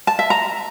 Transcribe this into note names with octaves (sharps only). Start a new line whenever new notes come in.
A5
E5
A#5